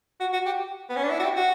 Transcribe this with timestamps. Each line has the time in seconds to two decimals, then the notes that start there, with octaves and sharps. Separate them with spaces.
0.20 F#4
0.33 F#4
0.46 G4
0.89 B3
0.96 C#4
1.03 D4
1.10 E4
1.20 F#4
1.23 G4
1.36 F#4